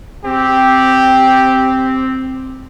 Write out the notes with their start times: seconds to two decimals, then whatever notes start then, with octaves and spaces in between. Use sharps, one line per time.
0.25 C4 G4